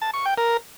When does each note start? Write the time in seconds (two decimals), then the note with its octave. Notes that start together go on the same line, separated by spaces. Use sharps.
0.02 A5
0.14 C#6
0.26 G5
0.38 A#4